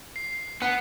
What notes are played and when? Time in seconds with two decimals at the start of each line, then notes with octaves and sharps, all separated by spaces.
0.16 C7
0.62 B3 F#5